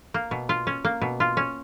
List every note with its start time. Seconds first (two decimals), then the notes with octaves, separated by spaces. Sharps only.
0.14 A#3
0.31 B2
0.49 F4
0.67 C#4
0.85 A#3
1.01 B2
1.20 F4
1.37 C#4